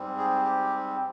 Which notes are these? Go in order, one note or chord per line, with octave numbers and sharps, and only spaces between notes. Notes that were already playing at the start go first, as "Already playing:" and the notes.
Already playing: G#2 G3 C4
G#4
G4